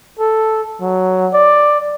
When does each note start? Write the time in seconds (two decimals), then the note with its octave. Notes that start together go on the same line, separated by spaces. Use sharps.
0.19 A4
0.81 F#3
1.33 D5